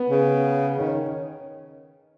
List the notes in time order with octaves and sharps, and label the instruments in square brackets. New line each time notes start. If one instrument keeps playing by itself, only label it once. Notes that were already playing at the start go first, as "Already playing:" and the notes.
Already playing: [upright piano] B3
[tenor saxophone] C#3
[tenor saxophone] D#3 [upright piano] C#4